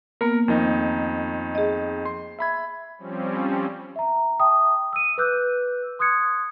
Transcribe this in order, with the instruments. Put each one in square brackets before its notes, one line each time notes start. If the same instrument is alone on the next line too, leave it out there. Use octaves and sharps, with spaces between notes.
[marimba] A#3 B3 [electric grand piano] A#4
[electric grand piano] F2 D#3 D#4
[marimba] G#4 D#5
[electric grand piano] C6
E5 B5 G#6
[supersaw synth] F3 G3 C4 C#4
[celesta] E5 A#5
E5 G5 A5 D#6
E6 D#7
B4 D6 E6 F#6 G6
C6 D#6 F#6 G#6 C#7